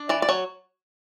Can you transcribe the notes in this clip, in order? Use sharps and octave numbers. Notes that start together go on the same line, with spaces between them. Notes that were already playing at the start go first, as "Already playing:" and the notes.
Already playing: D4
E3 D5
D5
F#3 C#5